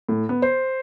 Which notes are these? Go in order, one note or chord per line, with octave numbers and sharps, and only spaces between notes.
A2
B3
C5